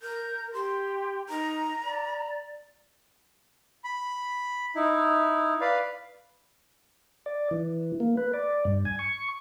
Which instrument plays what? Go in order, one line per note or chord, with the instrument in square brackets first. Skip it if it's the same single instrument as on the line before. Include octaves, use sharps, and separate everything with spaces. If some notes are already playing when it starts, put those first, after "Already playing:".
[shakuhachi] A#4 [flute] G6
[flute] G4 [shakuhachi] C6
[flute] D#4 [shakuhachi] A#5
[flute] D5
[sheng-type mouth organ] B5
D#4 E4
B4 D5 F5
[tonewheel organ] D5
E3
A#3
B4
D5
G2
G#5
C#6